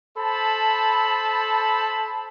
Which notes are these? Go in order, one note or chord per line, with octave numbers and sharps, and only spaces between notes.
A4 C5 A5 B5